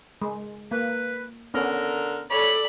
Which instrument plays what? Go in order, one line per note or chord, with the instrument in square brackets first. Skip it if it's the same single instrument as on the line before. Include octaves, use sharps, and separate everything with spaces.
[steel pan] G#3
[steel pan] A#3 [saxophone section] B4
[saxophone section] D3 A#4 [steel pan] B3 C#4
[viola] A4 D5 [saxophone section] C#5 [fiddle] B5